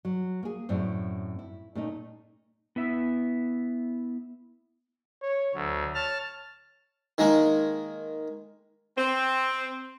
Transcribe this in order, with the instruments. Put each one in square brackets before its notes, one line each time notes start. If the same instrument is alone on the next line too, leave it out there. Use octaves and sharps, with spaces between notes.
[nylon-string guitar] F#3
A#3 G#4
F#2 A2 C4 D5
E4
A#2 A3 C#4 D#4
[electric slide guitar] B3 E4 E5
[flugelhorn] C#5
[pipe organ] D2 [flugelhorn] F#3
[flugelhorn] C#5 [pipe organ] A5 F6
[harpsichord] D#3 G#3 A#3
[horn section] C4